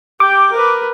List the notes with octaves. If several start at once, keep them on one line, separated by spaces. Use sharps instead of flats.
G4 G5 D6
A#4 B4